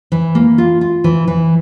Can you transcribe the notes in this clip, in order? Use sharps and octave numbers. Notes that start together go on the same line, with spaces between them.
E3
A#3
F4
F4
E3
E3